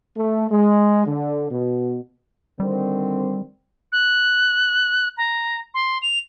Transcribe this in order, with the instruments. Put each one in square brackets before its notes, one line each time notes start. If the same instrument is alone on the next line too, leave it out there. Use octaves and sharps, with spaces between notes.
[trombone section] A3
G#3
D3
B2
[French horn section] D3 D#3 C4 [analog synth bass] G3
[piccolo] F#6
A#5
C6
F7